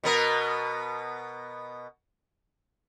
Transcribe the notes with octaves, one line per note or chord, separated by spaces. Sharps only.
B2 B3 A#4